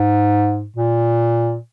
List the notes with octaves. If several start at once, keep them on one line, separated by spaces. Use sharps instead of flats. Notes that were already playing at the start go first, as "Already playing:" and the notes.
Already playing: G#2
A#2